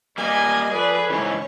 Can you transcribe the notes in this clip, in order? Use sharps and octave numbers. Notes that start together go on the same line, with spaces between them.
G3 A#3 D#5 G#5
F3 G#4 A4 B4 D5
G#2 C#3 E3 C#4 C#5